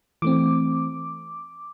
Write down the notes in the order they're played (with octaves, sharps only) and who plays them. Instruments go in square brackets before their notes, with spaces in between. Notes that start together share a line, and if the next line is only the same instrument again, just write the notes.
[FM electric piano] E3 A3 C4 D6